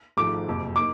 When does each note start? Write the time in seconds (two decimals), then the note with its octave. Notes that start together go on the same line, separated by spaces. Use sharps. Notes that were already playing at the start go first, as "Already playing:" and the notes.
0.17 G#1 G#2 F3 A3 D6
0.47 F#1 F2 C3
0.76 A#3 D#4 D6